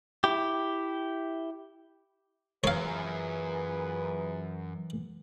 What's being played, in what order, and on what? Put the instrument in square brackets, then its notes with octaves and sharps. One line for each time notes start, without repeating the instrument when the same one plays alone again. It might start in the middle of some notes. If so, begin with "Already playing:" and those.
[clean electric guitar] E4 G4
[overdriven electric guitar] F#2 [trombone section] A#2 G#4 B4 [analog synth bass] E3 [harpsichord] C#5 F5